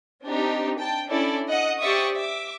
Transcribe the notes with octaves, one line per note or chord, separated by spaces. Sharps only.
C4 D4 D#4 G4
G5 A5
C#4 D4 E4 A4 D5
D#5 F#5 D#6
G4 C5 D5 E5 C#6 D#6
E5 D6